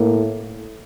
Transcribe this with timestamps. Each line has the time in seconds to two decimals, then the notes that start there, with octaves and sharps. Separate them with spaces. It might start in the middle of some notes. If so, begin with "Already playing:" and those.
Already playing: A2 A#3